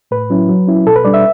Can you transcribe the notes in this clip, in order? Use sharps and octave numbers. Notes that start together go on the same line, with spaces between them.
A2 B4
F#3 C#4 E4
F#3
C#4 E4
B2 A4
B4
G3 D4 D5
E5